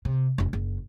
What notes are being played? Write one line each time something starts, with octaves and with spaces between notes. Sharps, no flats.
C3
F1 C#4
F#1